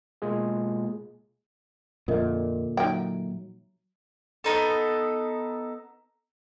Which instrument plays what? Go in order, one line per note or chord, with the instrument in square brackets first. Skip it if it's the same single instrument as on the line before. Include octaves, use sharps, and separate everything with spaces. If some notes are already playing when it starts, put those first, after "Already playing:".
[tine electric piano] B2 G#3 A#3 F4 G#4
[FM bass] F2 [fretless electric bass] A#2 D3 [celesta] A#4 D#5 E5
[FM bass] F#3 [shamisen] D#4 G5 [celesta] E5
[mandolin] B3 C#4 D#4 A4